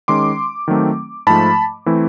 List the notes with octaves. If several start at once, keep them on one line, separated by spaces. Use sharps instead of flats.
D#3 G#3 C#4 C6 D6
D#3 F#3 A3 C4
G#2 F3 A3 A5 B5
E3 A3 C4 E4